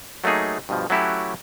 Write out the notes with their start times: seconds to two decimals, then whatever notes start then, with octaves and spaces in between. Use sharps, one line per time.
0.24 F#3 A3 A#3 D#4 G#4
0.69 G2 B2 F3
0.90 F#3 A3 C#4 E4 F#4 G4